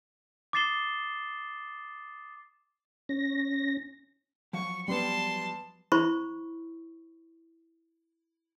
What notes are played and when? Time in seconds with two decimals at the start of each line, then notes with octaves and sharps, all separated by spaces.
0.53 D6 D#6 A6 C7 E7 G7
3.09 C#4 A#6
4.53 F3 F#3 F5 C#6
4.88 G3 B3 A5 C6
5.92 E4 C5 B5 C#6